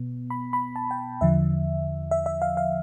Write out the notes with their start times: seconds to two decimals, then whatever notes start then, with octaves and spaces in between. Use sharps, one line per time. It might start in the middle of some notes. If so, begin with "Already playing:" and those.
Already playing: B2 B3
0.30 B5
0.53 B5
0.76 A5
0.91 G5
1.21 E2 D3 F3 E5
2.11 E5
2.26 E5
2.42 F5
2.57 F5